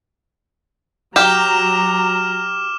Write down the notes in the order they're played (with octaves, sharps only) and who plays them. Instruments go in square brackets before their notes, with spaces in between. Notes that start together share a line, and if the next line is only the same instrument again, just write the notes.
[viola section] F#3 A#5 [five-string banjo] G4 [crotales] D6 F6 E7